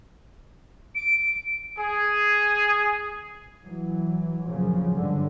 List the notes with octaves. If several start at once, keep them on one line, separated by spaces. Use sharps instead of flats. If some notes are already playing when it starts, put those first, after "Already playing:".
D7
G#4
E3 F#3
A#1 F#2 A#2 C#3 F3 F#3
G#1 G2 D3